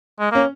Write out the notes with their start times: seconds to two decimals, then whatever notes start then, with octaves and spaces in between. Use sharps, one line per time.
0.20 G#3
0.31 A#3 C#4